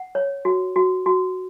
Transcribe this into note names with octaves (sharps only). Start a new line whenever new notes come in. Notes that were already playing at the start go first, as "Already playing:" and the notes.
Already playing: F#5
C#5
F#4
F#4
F#4